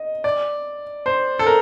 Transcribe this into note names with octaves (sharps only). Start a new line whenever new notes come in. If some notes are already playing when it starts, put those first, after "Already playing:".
Already playing: D#5
D5
C5
A4
A#4